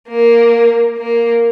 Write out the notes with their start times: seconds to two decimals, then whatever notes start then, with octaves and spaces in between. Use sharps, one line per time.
0.09 A#3
0.98 A#3